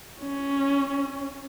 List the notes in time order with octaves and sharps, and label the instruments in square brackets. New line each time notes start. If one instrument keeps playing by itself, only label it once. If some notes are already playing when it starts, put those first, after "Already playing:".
[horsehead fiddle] C#4